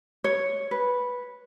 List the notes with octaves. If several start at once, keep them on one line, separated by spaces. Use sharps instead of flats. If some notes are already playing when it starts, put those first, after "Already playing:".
C#5
B4